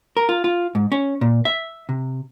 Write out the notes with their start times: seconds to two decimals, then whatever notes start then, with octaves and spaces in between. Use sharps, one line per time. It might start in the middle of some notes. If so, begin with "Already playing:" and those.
0.17 A#4
0.29 F4
0.44 F4
0.75 G#2
0.92 C#4
1.21 A#2
1.45 E5
1.89 C3